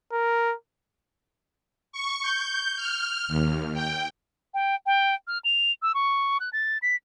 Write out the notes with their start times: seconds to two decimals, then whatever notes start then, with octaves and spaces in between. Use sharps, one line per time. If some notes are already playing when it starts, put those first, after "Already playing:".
0.12 A#4
1.92 C#6
2.22 G6
2.76 F6
3.28 D#2
3.74 G5
4.54 G5
4.86 G5
5.28 F6
5.44 F7
5.82 E6
5.95 C#6
6.40 F#6
6.53 A6
6.82 B6